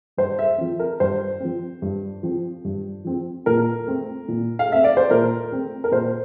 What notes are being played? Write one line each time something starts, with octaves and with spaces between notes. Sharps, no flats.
G2 C5
E5
F3 C4
A#4
G2 C5
F3 C4
G2
F3 C4
G2
F3 C4
A#2 A#4
A3 C4
A#2
F5
A3 C4 E5
D5
C5
A#2 A#4
A3 C4
A#4
A#2 C5